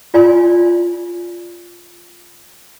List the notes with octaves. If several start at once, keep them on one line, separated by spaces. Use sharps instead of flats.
F4 D5 G#5 C6